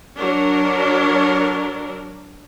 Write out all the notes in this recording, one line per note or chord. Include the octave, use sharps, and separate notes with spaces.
F#3 D4 A#4